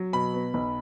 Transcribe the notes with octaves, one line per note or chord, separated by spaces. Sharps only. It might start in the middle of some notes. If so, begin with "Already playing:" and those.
Already playing: F#3
B2 B5
B3
B1